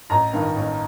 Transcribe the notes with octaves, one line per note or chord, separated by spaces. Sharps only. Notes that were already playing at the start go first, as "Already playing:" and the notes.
A1 A#5
G2 D#3
A1